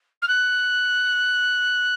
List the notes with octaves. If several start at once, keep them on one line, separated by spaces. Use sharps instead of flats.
F6
F#6